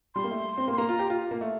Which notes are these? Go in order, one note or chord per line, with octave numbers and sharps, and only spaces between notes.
G3 C6
A#3
A3
C4
A#3
C6
A#3 A#5
F4
G4
F4
A#3
A3